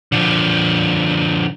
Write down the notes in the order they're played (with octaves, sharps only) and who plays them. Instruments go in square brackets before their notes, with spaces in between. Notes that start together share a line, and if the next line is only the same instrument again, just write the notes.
[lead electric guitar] D3 F3